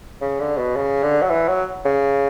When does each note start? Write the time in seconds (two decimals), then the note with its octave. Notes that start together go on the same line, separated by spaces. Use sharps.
0.21 C#3
0.40 D3
0.58 B2
0.76 C#3
1.03 D3
1.22 F#3
1.30 E3
1.48 F#3
1.85 C#3